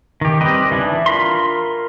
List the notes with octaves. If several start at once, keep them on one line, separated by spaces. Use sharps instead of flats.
D#3 G4
G3 C4 G4 B4 D#5
E3 D4 E4
F4 A#4 B5 C6